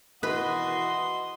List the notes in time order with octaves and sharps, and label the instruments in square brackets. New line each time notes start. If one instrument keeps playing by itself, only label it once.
[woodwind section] B2 E3 [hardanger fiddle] F#4 C6 [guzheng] B4 [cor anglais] D#5